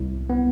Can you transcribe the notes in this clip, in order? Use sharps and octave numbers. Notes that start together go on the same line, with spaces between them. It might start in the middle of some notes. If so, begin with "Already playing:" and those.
Already playing: C2 E4
B3